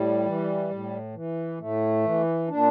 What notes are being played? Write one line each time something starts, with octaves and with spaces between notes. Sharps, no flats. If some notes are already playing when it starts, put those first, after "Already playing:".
Already playing: A2 G3
E3
A2
E3
A2 A3
E3
A#2 D4